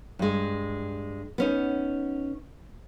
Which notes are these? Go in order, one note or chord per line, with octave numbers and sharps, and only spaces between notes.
G2 G#3
B3 C#4 D#4